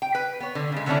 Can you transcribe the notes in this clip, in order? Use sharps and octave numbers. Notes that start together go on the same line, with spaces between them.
G5
B4
B3 C#5
D3
C#3 G#3
D3 A3 B3 C#4 D4 E4